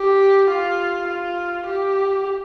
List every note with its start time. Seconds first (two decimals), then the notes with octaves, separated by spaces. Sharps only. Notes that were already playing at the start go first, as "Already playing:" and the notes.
Already playing: G4
0.50 F4
1.08 F4
1.67 G4